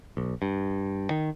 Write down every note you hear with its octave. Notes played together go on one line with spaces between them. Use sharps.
B1
G2
D#3